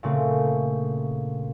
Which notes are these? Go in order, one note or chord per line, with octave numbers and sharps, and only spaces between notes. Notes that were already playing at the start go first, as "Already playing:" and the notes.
A#2 C#3 A3 C4